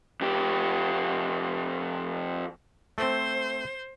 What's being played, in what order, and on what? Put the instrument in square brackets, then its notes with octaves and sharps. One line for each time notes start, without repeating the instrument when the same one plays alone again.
[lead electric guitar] F2 G4
[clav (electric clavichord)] A3 C4 [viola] C5